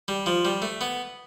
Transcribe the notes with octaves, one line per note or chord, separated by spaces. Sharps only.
G3
F3
G3
A3
B3